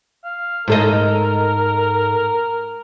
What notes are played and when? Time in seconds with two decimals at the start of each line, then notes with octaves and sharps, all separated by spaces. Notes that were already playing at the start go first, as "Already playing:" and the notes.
0.24 F5
0.68 G#2 A4 A#4 D#5